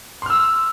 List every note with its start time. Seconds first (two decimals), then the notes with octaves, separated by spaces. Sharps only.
0.22 C6
0.26 F6
0.30 E6